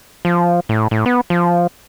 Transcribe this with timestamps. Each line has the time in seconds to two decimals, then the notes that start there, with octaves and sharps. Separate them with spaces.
0.25 F3
0.69 A2
0.91 A2
1.06 B3
1.30 F3